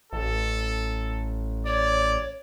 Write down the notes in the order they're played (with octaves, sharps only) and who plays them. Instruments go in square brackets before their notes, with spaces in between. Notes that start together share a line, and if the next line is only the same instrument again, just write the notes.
[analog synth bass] A1 [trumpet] A4
[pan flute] C#5 [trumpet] D5